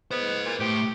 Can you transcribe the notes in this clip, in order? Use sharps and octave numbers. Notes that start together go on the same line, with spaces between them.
B3 C5 D#5
A#2
A2 G4